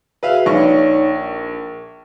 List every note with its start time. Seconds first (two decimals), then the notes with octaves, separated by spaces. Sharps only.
0.23 F#4 G#4 B4 E5 F5
0.46 A#1 D#4 C#5 D5 C#6
1.15 A#4